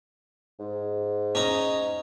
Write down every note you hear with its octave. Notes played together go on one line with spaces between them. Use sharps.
G#2
C#4 D#4 A#5